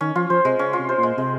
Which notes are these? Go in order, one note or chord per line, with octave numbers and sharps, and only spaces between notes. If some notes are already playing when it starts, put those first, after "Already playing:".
D#3 C#4
F3 F4
F3 C5
C3 G#3
C#3 C#4
F4
C3
C5
A#2
G#3
C3 G#3